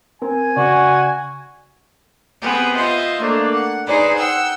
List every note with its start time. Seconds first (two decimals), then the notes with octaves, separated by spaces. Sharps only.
0.22 C4 A#4 G#5
0.57 C#3 F#4 D5
2.41 B3 C4 G4 G#4 B4
2.74 F4 C5 D#5 E5
3.19 A3 A#3 D4
3.52 F#5
3.85 D#4 G#4 B4 C5 D5
4.16 F#5 G5 E6